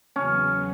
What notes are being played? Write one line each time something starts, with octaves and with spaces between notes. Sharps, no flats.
E2 C#3 F#3 B3 C#4